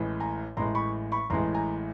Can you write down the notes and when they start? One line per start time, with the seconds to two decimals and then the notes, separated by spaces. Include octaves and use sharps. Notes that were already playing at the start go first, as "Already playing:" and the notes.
Already playing: A1 A2 E3 G#3
0.20 G#5 A#5
0.57 A1 A2 E3 G#3 A#5 C6
0.75 B5 C#6
1.12 B5 C#6
1.30 A1 A2 E3 G#3 A#5 C6
1.54 G#5 A#5